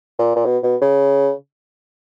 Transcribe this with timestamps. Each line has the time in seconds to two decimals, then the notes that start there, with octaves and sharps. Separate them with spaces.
0.19 A#2
0.36 A#2
0.45 B2
0.63 B2
0.82 C#3